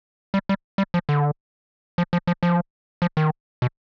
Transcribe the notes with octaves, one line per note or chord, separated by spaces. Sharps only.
G3
G3
G3
F3
D3
F3
F3
F3
F3
F3
D#3
B2